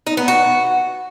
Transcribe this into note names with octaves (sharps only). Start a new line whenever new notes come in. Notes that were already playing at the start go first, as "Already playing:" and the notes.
D#4
B3
F#4